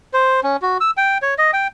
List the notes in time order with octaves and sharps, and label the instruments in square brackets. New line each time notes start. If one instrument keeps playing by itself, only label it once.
[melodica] C5
C#4
F#4
E6
G5
C#5
D#5
G5